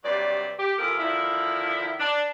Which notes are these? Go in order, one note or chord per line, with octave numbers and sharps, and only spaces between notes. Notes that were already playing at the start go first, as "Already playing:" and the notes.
G2 C3 F#3 D5
G4
C3 E3 F3 A#3 A4 A#4
D3 D#3 F3 E4
D4